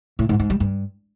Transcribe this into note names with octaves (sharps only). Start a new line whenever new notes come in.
A2
G#2
G#2
G3
G2